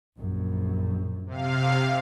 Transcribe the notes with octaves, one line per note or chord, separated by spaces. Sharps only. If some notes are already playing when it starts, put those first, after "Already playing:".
A#1 F#2
C3 F5